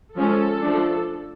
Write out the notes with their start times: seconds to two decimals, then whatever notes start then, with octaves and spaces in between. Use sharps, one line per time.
0.16 F3 G#3 C#4 A4
0.61 F3 A3 D4